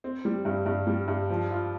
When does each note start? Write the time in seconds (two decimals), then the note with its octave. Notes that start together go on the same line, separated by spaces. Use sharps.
0.04 C4
0.25 G3
0.45 G2
0.66 G2
0.87 G3
1.08 G2
1.30 F3
1.50 F4